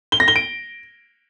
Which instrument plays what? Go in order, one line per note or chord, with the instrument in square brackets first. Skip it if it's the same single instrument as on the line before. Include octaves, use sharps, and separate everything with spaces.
[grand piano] G7
A#6
G7
D7